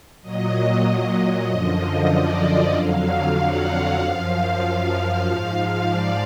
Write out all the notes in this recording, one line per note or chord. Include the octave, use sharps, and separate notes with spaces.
A#2 F#3 D#5
D#5
F#2 D3 F3
D5
D#5
F2 D3 F#3 F5
F#5
F5
F#2 F3 F5
G#2 F3
D5